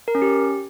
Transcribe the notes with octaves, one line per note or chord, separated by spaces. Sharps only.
A#4
C#4
G4